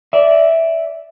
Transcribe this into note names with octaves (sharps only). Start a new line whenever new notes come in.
D5 E5